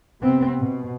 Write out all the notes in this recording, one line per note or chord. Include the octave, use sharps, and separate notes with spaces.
C3 B3 C4
B2